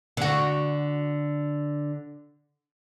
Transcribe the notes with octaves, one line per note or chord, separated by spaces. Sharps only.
D3 F#4